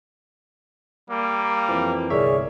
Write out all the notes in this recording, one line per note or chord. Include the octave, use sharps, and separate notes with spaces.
G3 A#3
F2 E3 F3
G1 C2 G#4 A#4 C#5 D5 E5